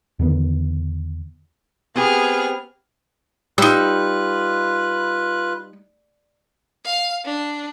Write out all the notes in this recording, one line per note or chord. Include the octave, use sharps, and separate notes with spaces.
E2 D3 D#3 B3
B3 C4 G4 G#4 F6
G3 D#4 F4 B4 E6 F#6
F5
D4